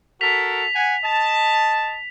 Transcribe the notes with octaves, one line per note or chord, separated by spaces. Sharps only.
F#4 A4 A#4 B6 F7
F#5 G#5
D#5 A5